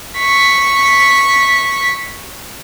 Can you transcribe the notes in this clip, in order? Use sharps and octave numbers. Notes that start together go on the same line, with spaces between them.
C#6 B6